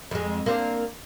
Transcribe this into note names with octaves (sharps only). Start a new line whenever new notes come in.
F2 G#3
A#3 C4 D4